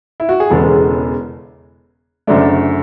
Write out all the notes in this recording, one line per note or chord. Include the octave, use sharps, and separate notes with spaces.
E4
F#4
G#4
E1 E2 C#3 G#3 B3 A4
F#1 F#2 D3 A3 D4